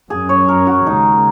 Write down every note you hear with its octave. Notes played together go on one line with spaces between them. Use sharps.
F#2 F#3 C#4 G#4
C#5
A#4
F#4
D#2 C#3 G#3 D#4